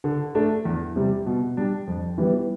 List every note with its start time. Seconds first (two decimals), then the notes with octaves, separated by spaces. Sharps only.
0.04 D3
0.35 A3 D4
0.65 E2
0.96 C3 G3
1.26 B2
1.57 G3 D4
1.87 F2
2.18 E3 G3 B3